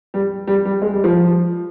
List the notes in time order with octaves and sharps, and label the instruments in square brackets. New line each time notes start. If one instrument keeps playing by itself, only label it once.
[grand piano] G3
G3
G3
G#3
G3
F3